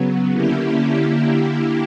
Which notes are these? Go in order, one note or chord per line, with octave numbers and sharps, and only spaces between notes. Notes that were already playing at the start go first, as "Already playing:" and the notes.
Already playing: C#3 F#3 B3
D3 A#3 C#4 E4 G4
D3 A#3 E4 G4